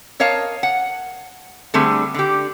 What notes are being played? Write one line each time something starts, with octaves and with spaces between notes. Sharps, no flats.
A#4 C#5 D#5 F5 A5
F#5
D3 G3 A3 C4 G#4
D3 G4